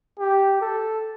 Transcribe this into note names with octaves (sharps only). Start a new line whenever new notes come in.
G4
A4